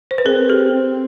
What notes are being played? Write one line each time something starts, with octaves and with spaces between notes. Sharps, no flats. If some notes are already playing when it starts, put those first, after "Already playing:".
C5
B4
C4 G#4 A#4
G4 A4
C4